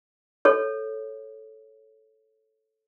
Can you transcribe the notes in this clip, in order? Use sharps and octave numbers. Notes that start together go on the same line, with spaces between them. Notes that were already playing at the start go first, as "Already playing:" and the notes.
A4 C#5